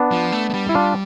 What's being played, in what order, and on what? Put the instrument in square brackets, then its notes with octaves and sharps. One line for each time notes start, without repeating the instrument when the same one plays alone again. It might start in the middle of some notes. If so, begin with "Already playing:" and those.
Already playing: [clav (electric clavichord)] B3 D4
[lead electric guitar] F3
A3
A3
G3
[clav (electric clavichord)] E4
D4 F4